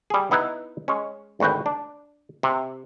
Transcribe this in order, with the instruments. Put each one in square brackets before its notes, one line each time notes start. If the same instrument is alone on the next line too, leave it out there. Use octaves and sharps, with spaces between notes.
[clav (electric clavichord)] G3 G#4
B3 D#4 E4 B4
G#3 C#4
G#1 D2 F#4 B4 G5
D4
C3